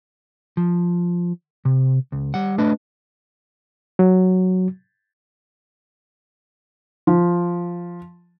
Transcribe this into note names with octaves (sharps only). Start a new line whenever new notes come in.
F3
C3
C#2
G3 F#5
A3 D4 B4 D#5
F#3
F3